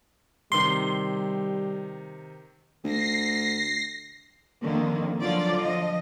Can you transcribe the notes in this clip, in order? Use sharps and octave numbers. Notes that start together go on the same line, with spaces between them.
C3 D#3 G3 C6
D2 A#6 C7
F2 D3 D#3 A#3
D3 F3 F#3 F4 D5
F3 D#5